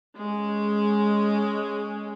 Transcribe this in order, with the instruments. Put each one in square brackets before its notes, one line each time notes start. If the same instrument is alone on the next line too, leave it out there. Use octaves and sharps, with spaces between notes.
[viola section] G#3 C#4